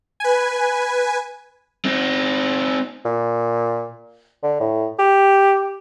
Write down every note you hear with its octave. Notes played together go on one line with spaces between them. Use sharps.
B4 G#5
C4 D#4
A#2
D3
A2
G4